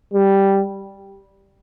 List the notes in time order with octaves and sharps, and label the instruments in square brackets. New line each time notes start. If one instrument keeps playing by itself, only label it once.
[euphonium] G3